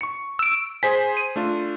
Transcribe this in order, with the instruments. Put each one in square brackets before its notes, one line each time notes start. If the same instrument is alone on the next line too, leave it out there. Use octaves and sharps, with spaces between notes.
[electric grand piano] C#6 C#7
[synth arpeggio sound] E6 D7
[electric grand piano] G#4 C5 G#5 [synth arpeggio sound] B6
[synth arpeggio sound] D#7
[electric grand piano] A3 D4 F4